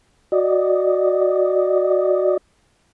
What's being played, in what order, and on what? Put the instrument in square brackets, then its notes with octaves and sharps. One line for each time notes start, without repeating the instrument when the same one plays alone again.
[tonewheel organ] F#4 D5 D#5